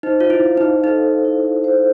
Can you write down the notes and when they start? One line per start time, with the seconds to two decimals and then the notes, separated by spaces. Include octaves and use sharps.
0.03 D#4 C5
0.20 F4
0.30 E4
0.44 F5
0.57 D#4
0.84 D#4 A4
1.25 E4
1.64 C5